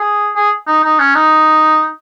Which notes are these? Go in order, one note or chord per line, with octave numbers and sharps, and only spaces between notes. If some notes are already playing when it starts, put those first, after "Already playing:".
Already playing: G#4
G#4
D#4
D#4
C#4
D#4